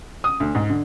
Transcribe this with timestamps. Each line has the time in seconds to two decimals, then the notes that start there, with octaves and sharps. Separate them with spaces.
0.24 D#6
0.40 D2
0.55 G#2
0.70 D3